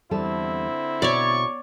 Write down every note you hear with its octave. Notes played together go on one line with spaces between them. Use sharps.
E2 D3 G3 C4 E4 A4
B2 C#5 D5 C#6